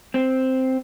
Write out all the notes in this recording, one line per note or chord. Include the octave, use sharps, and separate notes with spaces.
C4